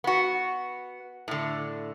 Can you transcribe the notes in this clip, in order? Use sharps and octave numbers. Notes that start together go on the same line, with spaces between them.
B3 F#4
A2 D3